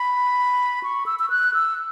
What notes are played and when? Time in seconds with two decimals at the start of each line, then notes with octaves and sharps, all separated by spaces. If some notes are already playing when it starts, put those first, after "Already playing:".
Already playing: B5
0.83 C#6
1.06 E6
1.19 E6
1.30 F#6
1.54 E6